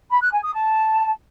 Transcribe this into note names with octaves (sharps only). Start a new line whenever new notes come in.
B5
F#6
G#5
D#6
A5